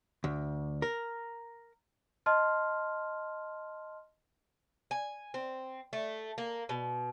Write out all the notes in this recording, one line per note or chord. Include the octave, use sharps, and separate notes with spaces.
D2
A#4
D#5 A5 C6 F6
G#5
C4
A3
A#3
B2